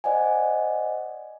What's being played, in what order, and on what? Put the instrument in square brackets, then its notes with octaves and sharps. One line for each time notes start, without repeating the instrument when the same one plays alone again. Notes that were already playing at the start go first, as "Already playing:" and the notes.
[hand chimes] C5 D5 D#5 F#5 G#5